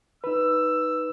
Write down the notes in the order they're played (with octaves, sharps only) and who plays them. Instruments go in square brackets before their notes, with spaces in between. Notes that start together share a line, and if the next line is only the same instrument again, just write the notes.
[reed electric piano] D#4 B4 [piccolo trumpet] E6